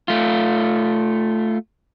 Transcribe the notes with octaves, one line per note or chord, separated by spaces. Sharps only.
A3 F4